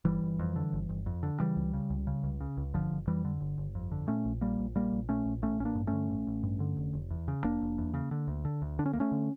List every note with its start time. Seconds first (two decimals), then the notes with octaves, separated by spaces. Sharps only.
0.05 G1 E3 G3
0.22 G1
0.39 F2
0.56 D3
0.73 G1
0.89 G1
1.06 F2
1.23 D3
1.40 C#3 E3 G3
1.56 C#2
1.73 C#3
1.90 C#2
2.07 C#3
2.23 C#2
2.40 C#3
2.57 C#2
2.74 G1 D3 F3
2.91 G1
3.07 F2 E3 G3
3.25 D3
3.41 G1
3.58 G1
3.75 F2
3.92 D3
4.08 A#2 A3 C#4
4.25 A#1
4.41 A#2 G3 A#3
4.59 A#1
4.75 A#2 G3 A#3
4.93 A#1
5.09 A#2 A3 C#4
5.25 A#1
5.42 A1 A3 C#4
5.59 A1 C#4
5.65 A#3 D4
5.76 G2
5.87 A3 C#4
5.93 D3
6.10 A1
6.27 A1
6.43 G2
6.60 D3
6.77 F1
6.93 F1
7.10 E2
7.28 C#3
7.43 F1 A#3 D4
7.61 F1
7.78 E2
7.94 C#3
8.11 D3
8.28 D2
8.45 D3
8.62 D2
8.79 D3 D4
8.86 C#4
8.93 D2 A#3
9.00 A3 C#4
9.12 D3